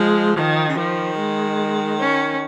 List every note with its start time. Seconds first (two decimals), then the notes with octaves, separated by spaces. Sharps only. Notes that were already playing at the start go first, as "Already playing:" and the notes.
Already playing: F3 G#3
0.36 D#3 F3
0.68 C#3
0.77 D#3 F3
1.18 G#3
1.99 C#4